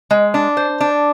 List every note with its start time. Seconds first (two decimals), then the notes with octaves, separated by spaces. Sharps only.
0.11 G#3
0.34 D4
0.57 C5
0.81 D4